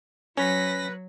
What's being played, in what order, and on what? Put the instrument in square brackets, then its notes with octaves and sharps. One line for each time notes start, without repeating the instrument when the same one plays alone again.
[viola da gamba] F#3 [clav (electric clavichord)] C#4 [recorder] B4 [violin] A#6 B6